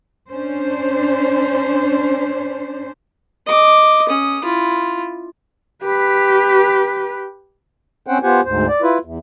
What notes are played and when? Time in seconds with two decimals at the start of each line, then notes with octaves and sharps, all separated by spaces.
0.30 C#4 D4 C5
3.46 D#5 D6
4.09 C#4 D#6
4.44 E4 F4
5.84 G4 B4
8.07 C4 C#4 C5 F#5 G5
8.23 B3 F4 G4 C5 F#5 G#5
8.45 D2 G#2 C5
8.68 D5
8.82 E4 F4 B4
9.05 E2